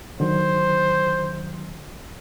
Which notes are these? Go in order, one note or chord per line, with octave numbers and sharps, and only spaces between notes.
D3 D#3 F#3 C5